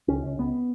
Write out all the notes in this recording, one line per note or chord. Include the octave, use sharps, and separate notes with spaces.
C#2 C#4
C#2
C#2 B3